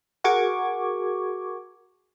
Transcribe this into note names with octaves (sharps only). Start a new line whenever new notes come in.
F#4 G#4 A#4 C#6 D6 G#6